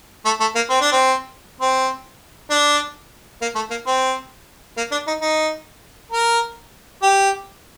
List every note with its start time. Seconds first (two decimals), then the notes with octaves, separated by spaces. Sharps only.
0.25 A3
0.40 A3
0.55 A#3
0.70 C4
0.81 D4
0.93 C4
1.61 C4
2.50 D4
3.42 A#3
3.55 A3
3.70 A#3
3.87 C4
4.77 A#3
4.92 D4
5.07 D#4
5.21 D#4
6.12 A#4
7.03 G4